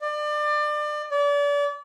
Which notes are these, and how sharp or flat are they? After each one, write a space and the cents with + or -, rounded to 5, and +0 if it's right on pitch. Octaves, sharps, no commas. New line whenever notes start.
D5 +30
D5 -35